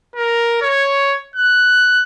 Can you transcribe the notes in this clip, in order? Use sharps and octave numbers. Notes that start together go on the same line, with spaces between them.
A#4
C#5
F#6